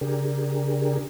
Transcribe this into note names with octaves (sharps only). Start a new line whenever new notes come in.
C#3 D4 G4 G#4 A#4